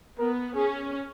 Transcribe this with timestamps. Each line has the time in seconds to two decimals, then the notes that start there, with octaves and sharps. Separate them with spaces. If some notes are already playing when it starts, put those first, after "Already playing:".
0.18 B3 A#4
0.55 C#4 G#4